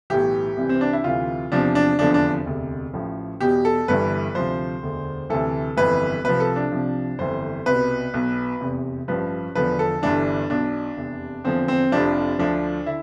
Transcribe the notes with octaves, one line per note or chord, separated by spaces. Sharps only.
B1 A2 E3 G4
C2 C3 E3
C4
D4
E4
D2 C3 E3 F4
E2 C3 F3 D4
D4
F1 E2 D3 F3 D4
D4
E1 D2 C3
A1 A2 F3
E2 B2 G4
A4
G1 G2 E3 B4
D2 C3 F3 C5
E1 D2 D3
D2 C3 E3 A4
G1 F2 E3 B4
C2 C3 F3 B4
A4
D4
C2 C3 F3
G1 F2 E3 C5
C2 B2 B4
B1 B2
F1 E2 C3
A1 G2 F3 B4
E1 E2 D3 F3 B4
A4
G1 G2 E3 D4
B1 B2 D4
F1 E2 C3
E2 D3 F3 C4
C4
F1 F2 C3 F3 D4
D2 D3 F3 D4
D3 E4